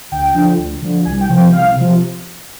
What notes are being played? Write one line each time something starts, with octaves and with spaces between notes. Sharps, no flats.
D2 G5
D3 F3
D2
D3 F3
C2 G#5
G5
C3 F3
G5
C2 F5
C3 F3